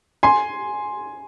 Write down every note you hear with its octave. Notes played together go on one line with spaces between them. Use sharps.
G#5 C6